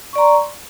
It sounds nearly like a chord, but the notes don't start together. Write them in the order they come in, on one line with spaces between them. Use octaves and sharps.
C#6 D5 A#5 C6